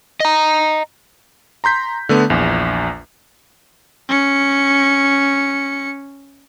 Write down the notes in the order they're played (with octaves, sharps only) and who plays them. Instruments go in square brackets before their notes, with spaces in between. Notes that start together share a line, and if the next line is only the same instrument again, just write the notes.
[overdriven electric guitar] D#5 A#5
[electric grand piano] A#5 C6 G6 B6
D3 A3 B3
A#1 E2
[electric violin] C#4 C#7